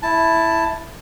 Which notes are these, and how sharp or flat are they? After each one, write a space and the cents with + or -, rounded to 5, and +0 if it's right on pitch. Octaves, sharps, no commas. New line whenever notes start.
E4 +0 A5 +0